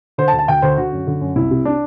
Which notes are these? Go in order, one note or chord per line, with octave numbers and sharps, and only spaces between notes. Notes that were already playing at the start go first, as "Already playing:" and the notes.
D3 C5
A5
D2
A5
D2 G5
D2 C5
D3 F#4
F#2
D3
F#2
C2 E4
C3
D4